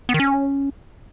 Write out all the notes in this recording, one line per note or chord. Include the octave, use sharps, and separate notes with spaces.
B3
D#3
C#4